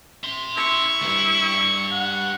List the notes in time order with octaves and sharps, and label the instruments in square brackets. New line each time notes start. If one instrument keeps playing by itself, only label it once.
[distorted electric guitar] E5 C6
[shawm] E4 [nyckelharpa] C#6
[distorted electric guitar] D2 G2
[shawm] F#5